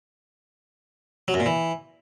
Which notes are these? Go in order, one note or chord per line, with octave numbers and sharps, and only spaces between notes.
F#3
F#2
A#2
E3